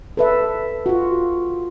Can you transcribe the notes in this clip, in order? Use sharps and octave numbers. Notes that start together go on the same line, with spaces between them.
A4 B4 E5
F4 F#4